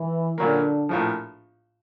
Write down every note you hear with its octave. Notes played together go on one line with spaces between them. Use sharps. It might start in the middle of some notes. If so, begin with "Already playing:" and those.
Already playing: E3
A#1 A#2 D3 F#3 A#3
A#1 A2 F3